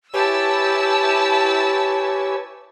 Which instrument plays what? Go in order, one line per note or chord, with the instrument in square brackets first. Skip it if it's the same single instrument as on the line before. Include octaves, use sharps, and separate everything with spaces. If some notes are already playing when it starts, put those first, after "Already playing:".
[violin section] E4 A5 E6 [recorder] G4 [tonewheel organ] B4 C#5 G#5